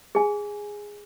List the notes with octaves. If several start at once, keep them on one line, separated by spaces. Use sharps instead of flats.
G#4 G#5